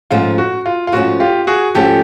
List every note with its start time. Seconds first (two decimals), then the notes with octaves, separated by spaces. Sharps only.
0.11 G#2 F3 A3 C#4 F4
0.38 F#4
0.66 F4
0.87 F4
0.92 G#2 F3 A3 C#4 F#4
1.20 F4 G4
1.47 F#4 G#4
1.75 G#2 F3 A3 C#4 G4 A4